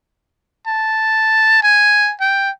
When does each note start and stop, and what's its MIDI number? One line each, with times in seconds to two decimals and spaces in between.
0.67 1.60 81
1.63 2.14 80
2.21 2.50 79